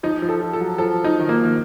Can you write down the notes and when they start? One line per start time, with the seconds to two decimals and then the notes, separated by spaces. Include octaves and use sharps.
0.03 F3 D#4
0.22 F3
0.29 A4
0.41 F3
0.53 A4
0.60 F#3
0.78 F3 A4
1.04 F3 D#4
1.20 D#3
1.29 F3 A#3
1.45 D#3